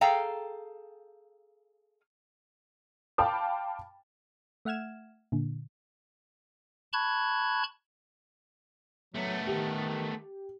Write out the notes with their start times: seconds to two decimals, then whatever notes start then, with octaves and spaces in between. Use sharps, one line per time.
0.01 G#4 A4 F5 G5 A#5
3.18 F5 G5 A5 B5 D6
4.65 A3 E5 F#5 F6 G#6 E7
5.32 A#2 D3
6.93 A5 B5 C#6 F#6 G#6
9.14 F#3 A3 B3
9.47 D#3 G4